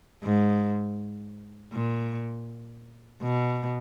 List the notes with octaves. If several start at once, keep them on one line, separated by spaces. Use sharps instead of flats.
G#2
A#2
B2